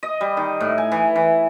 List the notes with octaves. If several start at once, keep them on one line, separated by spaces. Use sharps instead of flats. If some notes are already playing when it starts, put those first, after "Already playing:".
D#5
G3
D#3
A2
G#5
E3
E3